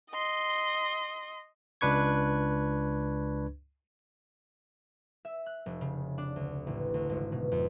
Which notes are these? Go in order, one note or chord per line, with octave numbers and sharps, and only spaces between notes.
D#5 C6
C#2 D4 B4 C#6 G#6
E5
F#6
F1
C#3
D4
D2
A1
D2
G#1
B2
F2